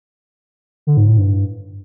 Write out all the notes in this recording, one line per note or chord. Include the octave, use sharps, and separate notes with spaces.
D3
G#2
A2
G2